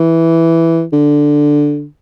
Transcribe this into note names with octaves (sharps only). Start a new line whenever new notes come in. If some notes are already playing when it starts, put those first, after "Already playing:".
Already playing: E3
D3